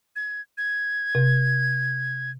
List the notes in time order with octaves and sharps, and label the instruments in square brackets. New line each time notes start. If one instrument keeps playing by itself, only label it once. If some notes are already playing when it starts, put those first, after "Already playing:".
[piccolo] G#6
G#6
[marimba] C3